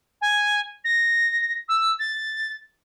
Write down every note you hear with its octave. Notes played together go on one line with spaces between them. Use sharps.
G#5
A#6
E6
A6